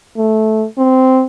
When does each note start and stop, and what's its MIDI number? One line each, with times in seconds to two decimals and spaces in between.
0.17 0.65 57
0.78 1.24 60